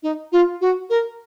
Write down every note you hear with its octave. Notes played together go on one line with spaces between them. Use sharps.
D#4
F4
F#4
A#4